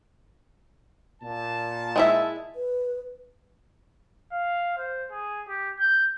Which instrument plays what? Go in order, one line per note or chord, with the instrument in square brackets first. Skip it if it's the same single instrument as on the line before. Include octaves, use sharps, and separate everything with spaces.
[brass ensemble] A#2 A5
[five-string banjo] G#3 E4 E5
[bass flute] B4
[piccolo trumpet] F5
C5
G#4
G4
G6